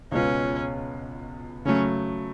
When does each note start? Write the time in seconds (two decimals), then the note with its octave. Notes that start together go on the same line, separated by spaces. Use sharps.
0.12 C#2 B2 G#3 B3 C#4 F4
1.65 C#3 F#3 A3 C#4